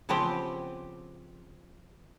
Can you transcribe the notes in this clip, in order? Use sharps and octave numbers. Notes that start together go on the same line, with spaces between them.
C#3 F3 B3 C4 G4